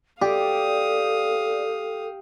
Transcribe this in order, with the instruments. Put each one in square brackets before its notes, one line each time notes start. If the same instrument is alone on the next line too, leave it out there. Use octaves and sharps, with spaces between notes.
[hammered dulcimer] G4 [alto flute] A4 [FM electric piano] D5 [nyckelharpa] F5 D#6